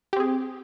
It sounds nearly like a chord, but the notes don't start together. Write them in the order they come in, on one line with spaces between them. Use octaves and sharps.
G4 C4 G#4